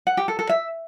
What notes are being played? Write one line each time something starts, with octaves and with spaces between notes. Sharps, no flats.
F#5
G4
A4
A4
E5